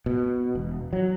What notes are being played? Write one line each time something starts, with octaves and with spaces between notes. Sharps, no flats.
B2
E1
F#3